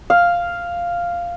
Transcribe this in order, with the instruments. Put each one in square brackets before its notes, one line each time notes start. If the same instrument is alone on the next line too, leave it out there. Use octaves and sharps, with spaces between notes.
[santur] F5